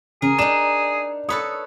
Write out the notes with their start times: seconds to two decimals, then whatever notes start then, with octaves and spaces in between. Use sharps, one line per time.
0.22 C#3 G#4 A#4
0.38 D4 D#4 E7
1.29 A4 B4 C#5 D#6